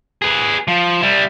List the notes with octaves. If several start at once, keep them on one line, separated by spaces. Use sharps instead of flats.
G#4 B4
F3
G3 E4